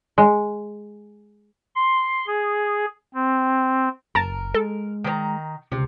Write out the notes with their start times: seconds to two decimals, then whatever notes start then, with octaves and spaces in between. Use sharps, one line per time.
0.18 G#3
1.75 C6
2.27 G#4
3.14 C4
4.15 F#1 A#4 A5 A#5
4.54 G#3 A4
5.04 D#3 C5 A#5
5.72 C#2 C3